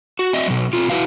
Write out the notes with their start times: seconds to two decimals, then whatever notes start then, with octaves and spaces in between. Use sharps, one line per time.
0.19 F#4
0.33 C4 D#5 E5
0.47 B2 F#3
0.73 B2 C4 F4
0.90 E4 F#4 B4 F5